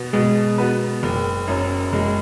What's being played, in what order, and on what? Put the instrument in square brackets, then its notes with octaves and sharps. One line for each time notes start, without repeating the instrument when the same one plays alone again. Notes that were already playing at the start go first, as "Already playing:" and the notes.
Already playing: [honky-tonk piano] B2 B3 F#4
[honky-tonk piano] B2 [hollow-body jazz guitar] G#3
[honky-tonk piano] B3 F#4 B4
F#1
F#2 F#3
[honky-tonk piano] F#1 [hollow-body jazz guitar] G#3